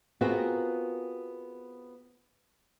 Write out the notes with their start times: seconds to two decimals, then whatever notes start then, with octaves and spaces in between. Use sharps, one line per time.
0.21 B3 C4 F4 F#4 G#4 A#4